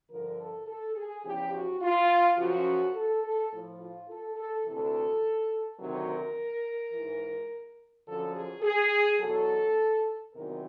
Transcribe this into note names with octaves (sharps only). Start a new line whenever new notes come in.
G2 D3 F3 A#4
A4
A4
G#4
E2 C#3 F3 G4
F#4
F4
F#2 C#3 F3 F#4
A4
A4
A2 F3
F4
A4
A4
D2 C3 E3 A4
D2 C3 D#3 F#3 A#4
G#2 E3
F#2 D3 F3 A4
G#4
G#4
E2 B2 F#3 A4
E2 C3 D#3 F#3 A#4